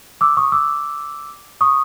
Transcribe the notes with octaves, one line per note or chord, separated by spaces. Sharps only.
D6 E6
C#6 D#6
D6 E6
C#6 D#6